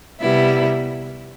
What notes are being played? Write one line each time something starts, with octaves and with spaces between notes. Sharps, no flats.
C3 G3 B3 E4